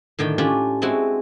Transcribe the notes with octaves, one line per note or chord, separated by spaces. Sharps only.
A2 D3 D#3 G5
C#4 D4 F4 G4
G#3 C4 E4 F#4